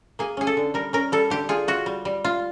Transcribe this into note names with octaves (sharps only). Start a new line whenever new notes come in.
A#3 G#4
C#4 G#4
A4
D3
G3 A#4
C#4 A#4
G3 A4
D3 G4
F4 G#4
F4 F#4
G3
G3
F4